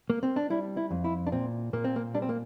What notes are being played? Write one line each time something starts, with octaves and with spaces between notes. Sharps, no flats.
A#3
C4
D4
G3 E4
E4
F2
E4
D4
A#2 C4
A#2 A#3
C4
A#3
G3 D4
C4
A#3